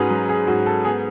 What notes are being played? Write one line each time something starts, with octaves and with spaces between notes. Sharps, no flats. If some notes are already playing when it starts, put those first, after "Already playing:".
Already playing: G#2 C#4 F#4 G#4 B4
F#3
G#4
G#2 F#4
A4
B3 G#4